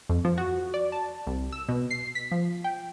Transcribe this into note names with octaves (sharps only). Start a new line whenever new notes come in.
F2
F3
F#4
D5
A5
C2
E6
B2
C7
B6
F3
G5